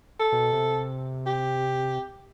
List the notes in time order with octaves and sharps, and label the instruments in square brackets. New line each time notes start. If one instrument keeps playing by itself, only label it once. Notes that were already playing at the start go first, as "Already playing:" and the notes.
[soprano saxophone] A4
[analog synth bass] B2
C3
[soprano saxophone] G4